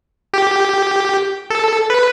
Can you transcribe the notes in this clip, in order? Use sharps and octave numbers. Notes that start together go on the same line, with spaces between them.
G4
A4
B4